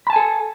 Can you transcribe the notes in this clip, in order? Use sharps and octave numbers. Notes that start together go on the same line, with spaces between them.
A4 G#5 A5 B5